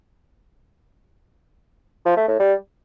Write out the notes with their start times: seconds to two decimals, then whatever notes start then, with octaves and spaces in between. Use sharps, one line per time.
2.06 F3
2.17 A3
2.28 A2
2.40 G3